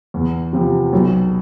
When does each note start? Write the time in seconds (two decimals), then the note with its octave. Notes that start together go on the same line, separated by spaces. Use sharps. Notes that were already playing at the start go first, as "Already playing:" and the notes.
0.14 E2
0.53 C3 F3
0.93 B1